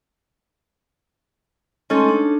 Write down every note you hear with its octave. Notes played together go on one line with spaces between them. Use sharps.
G#3 A3 C#4 D#4 A4 C6
D4